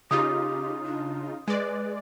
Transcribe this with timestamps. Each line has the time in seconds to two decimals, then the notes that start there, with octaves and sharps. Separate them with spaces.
0.11 C#3 D#4 F4 G4 D#6
0.86 D4
1.48 G#3 B4 D5